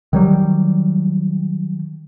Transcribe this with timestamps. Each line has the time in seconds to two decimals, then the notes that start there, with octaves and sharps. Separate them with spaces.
0.13 D#3 F#3 G3